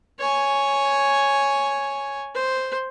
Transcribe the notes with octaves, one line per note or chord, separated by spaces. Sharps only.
C#5 G#5
C5